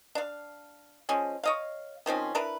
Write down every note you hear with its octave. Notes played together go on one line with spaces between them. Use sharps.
D4 F5
F3 G#3 C#4
C#5 D#5 F5
D#3 F3 C4 C#4
D4 E4 A#4 B4